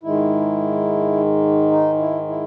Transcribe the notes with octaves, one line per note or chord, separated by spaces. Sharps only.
G#2 D#3 G#3 E4
D#4
E4
E4